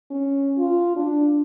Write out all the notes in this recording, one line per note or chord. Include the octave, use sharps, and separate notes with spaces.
C#4
F4
D4